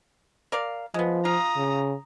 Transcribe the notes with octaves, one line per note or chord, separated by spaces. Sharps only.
A#4 D5 F5
F3 G#3 B3
F4 A#5 D#6
C#3